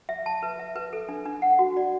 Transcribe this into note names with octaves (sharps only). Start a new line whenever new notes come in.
E5
A5
B4
E5
B4
A4
D4
D4
F#5
F#4
D5